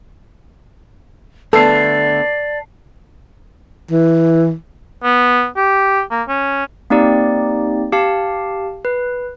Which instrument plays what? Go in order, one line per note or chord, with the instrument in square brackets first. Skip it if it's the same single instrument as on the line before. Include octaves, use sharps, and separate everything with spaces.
[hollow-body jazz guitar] D3 A3 B3 [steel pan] A4 [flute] D5 [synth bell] A5 C7
[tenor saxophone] E3
[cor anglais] B3
G4
A#3
C#4
[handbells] A#3 C4 D#4 G4 D5
G4 F5 A5
B4